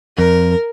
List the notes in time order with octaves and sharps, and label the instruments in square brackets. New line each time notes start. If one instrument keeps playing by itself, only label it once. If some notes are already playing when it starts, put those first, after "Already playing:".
[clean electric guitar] F2 [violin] A#4